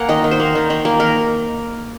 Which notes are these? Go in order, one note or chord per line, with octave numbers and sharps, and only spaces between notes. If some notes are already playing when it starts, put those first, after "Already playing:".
Already playing: A#3 F#5 G#5
D#3 D#5
D#3
C5
A#3
D#3
D#3
A#3
D#3 A#4